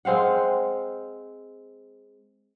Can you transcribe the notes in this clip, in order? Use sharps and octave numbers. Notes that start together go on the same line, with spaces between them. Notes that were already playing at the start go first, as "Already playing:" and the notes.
G#3 C4 F5 F#5